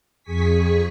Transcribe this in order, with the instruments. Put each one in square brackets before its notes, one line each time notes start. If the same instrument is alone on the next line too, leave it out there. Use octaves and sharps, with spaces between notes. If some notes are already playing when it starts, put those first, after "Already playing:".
[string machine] F2 G#4 G#5 C#6 B6